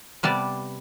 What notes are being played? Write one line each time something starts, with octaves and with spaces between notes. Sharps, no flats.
C3 G3 B3 D5 A5